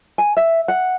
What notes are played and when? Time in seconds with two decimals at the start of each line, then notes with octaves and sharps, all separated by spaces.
0.18 G#5
0.37 E5
0.68 F#5